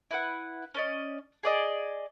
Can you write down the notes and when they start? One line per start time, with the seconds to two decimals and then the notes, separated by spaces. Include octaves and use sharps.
0.11 E4 B4 F#5
0.74 C#4 D5 D#5
1.43 G#4 D5 D#5